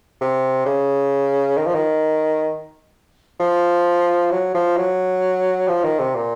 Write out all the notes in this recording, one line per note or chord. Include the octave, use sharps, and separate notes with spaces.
C3
C#3
D#3
F3
D#3
F3
F#3
F3
F#3
F3
D#3
C3
A#2